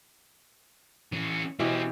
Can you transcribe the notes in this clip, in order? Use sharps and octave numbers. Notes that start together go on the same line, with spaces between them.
E3 C#4
B2 E3 C4 C#4 G4